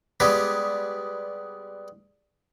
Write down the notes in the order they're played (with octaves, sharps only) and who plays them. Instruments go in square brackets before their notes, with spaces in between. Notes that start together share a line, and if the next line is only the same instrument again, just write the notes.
[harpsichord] G3 G#3 B3 G4